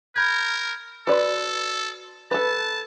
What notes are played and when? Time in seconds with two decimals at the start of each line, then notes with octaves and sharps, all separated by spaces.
0.16 A#4 B5 G6 G#6
1.07 F#4 A4 B4 D5 C6
2.31 A4 B4 A5 B5